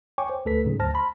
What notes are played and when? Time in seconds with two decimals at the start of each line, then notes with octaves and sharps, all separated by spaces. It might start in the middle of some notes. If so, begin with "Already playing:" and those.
0.18 C#5 G5 G#5 C#6 D6
0.30 C5
0.45 D2 A3 A4 B4 B6
0.65 G#2 C#3 F#3
0.79 D2 C5 A5 F6 A#6
0.94 A5 B5 C6